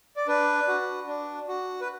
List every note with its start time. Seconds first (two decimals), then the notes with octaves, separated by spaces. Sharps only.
0.16 D5
0.28 D4 B4
0.68 F#4
1.07 D4
1.48 F#4
1.81 B4